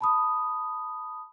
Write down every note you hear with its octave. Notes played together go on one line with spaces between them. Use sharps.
A5 B5 D#6